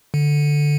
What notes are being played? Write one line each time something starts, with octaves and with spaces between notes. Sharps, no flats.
D3